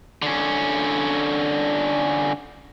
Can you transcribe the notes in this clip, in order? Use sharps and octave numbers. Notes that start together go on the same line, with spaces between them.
D3 C#4